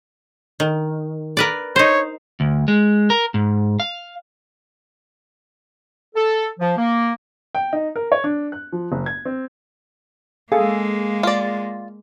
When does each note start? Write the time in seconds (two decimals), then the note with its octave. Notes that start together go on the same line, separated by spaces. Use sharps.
0.60 D#3
1.37 A#4 B4 D5
1.76 D#4 C5 C#5
2.40 D2
2.68 G#3
3.10 A#4
3.34 G#2
3.80 F5
6.15 A4
6.59 F3
6.78 A#3
7.55 G5
7.73 D#4
7.96 A#4
8.12 C#5
8.24 D4
8.52 F#6
8.73 F3
8.92 F#1
9.06 G#6
9.25 C4
10.52 G#3 A#3 G#4 A4 F5
11.23 F4 D5